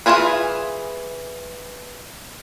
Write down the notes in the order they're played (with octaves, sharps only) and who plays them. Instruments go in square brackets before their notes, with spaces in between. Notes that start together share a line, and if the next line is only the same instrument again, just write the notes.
[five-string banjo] E3 E4 F4 G#4 B4